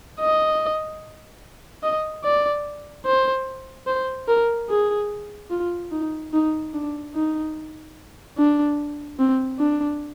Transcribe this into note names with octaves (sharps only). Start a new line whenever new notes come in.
D#5
D#5
D5
C5
C5
A#4
G#4
F4
D#4
D#4
D4
D#4
D4
C4
D4